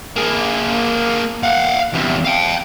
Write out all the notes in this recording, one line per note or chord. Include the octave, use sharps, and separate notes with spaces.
A#3 G#4
F5 F#5
E2 C3
F5 G5